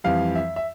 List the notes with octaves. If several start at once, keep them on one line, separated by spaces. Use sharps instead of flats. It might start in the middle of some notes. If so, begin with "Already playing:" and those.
F2 E3 G3 F5
E5
E5